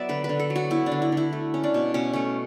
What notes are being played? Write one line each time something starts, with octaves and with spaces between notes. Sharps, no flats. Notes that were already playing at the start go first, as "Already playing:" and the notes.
Already playing: F#3 B3 D5 E5
D3 B4
B4
D3
A4
F#3
F#4
B3 E4
D4
D3
E4
D3 E4
A3
C#4
D4
B2
B2 C#4
A3 C#4